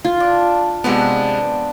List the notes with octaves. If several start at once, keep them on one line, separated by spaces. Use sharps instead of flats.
F4
D4
C3 F3 G#3 B3 D4 F#5